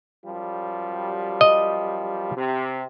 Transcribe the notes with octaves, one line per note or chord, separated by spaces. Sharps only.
F#2 F3 G3
D#5
C3